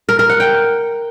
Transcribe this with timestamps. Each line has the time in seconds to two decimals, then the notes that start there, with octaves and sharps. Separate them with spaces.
0.09 A#4
0.19 A#4
0.29 F#5
0.40 G5